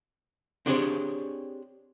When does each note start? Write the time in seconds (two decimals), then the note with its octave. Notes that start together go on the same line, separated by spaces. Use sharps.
0.66 C4 D4 G4 G#4 C5 C#5